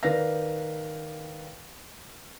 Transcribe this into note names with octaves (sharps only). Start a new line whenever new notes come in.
D#3 B4 D5 F5 A#6